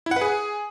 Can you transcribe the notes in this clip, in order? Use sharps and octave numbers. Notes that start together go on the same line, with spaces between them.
E4
F#5
B4
G#4